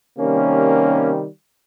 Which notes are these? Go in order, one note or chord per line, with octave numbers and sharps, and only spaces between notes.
C3 D#3 G3 A#3 C#4